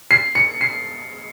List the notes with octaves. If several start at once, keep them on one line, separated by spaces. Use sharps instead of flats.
C7
C#7
C7